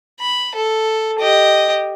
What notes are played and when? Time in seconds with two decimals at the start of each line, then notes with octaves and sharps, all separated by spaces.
0.20 B5
0.55 A4
1.20 G4 D#5